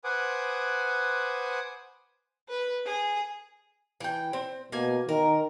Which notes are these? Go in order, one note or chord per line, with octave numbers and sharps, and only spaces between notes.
B4 C5 F#5 G#5 D6 D#6
B4
G#4
E3 G5
C4
B2 A#3 G#5
D#3 A#4